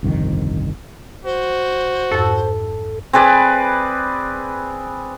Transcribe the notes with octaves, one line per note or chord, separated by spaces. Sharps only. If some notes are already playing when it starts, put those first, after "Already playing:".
G1 C2 F2 D#3
F#4 C5
F2 G#2 A4
C4 G#4 B4 D5